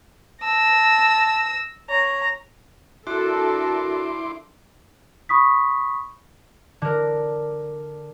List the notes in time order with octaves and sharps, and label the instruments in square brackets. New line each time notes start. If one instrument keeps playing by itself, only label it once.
[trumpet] A5 [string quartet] E6 A#6
[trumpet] C#5 [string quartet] A#5
[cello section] D4 A4 A#4 [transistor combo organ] E4 C6 D6 [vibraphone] F#4
[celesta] B5 C#6 D#6 B6
[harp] D3 A#4